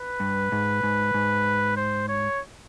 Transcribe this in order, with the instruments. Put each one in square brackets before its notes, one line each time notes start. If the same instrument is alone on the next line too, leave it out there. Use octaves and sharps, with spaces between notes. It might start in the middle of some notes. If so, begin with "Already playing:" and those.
Already playing: [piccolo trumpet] B4
[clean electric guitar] G2
G#2
G#2
G#2
[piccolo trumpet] C5
C#5